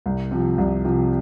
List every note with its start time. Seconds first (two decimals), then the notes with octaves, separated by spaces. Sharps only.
0.06 C2
0.31 C3 F3
0.58 C2
0.85 C3 F3